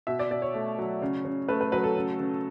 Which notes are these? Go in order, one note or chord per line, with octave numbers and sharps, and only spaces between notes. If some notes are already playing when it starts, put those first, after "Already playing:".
B2 E5
D5
B2 D5
C#5
A3
F#3
C#3
C#3
A3 B4
B4
F#3 B4
A4
C#3
C#3